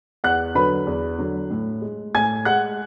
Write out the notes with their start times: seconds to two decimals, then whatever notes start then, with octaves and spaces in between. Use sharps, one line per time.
0.24 E2 F#5 F#6
0.55 D3 F#3 B4 B5
0.87 E2
1.18 D3 F#3
1.51 A2
1.82 G#3
2.15 A2 G#5 G#6
2.45 G#3 F#5 F#6